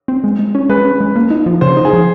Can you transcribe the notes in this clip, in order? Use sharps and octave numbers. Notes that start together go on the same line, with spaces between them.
C4
G#3
G#3
C#4
G#3 B4
C#4
G#3
A#3
D#4
F3
C#3 C5
D#4
G#4
F3